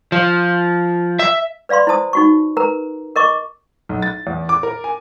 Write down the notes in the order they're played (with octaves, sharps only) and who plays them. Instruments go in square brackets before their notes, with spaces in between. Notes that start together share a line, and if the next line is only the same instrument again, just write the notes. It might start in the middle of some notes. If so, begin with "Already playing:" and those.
[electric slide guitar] F3
E5
[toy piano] B4 D5 F5 B5 C6
E4 C5 A5 D#6
D#4 F#4 C#6
A#4 B4 A#5
A#4 D#5 C#6 D6
[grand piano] B1
A6
E2
D6
A#4
G#5